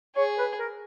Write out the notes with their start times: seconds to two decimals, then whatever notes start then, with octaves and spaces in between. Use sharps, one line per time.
0.16 G#4 C#5
0.38 B4
0.59 A#4